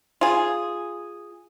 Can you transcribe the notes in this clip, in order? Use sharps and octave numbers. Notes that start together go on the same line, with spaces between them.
F4 G#4